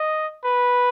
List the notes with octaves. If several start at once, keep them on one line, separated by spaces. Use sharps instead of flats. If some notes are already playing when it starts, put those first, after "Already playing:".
Already playing: D#5
B4